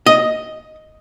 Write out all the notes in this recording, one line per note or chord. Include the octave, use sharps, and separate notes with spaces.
D#5